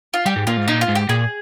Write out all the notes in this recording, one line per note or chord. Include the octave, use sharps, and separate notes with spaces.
F4
G3 G4
G#2
A#2 F4
G#2
A#2 D#4
F4
G#2
G4
A#2 G#4